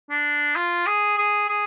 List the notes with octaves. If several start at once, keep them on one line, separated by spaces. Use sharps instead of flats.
D4
F4
G#4
G#4
G#4